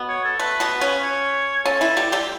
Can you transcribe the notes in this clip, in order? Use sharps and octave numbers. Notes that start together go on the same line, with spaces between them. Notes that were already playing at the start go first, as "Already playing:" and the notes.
Already playing: B2 B3
C#5
A4
A3 B4
B2 B3
C#3 C#4
C#5
C#3 C#4 A4
E3 E4
G3 G4
G3 G4